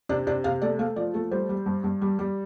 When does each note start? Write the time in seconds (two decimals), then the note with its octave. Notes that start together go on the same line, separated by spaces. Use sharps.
0.09 C3 D4
0.27 C3 D4
0.44 C3 F5
0.62 A3 D5
0.79 A3 F5
0.96 F3 D5
1.14 A3 A4
1.31 G3 C5
1.49 G3
1.66 G2
1.84 G2
2.02 G3
2.19 G3